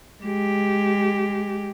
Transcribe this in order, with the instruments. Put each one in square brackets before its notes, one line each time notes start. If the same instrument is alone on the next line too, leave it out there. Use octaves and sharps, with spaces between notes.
[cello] G#3 G4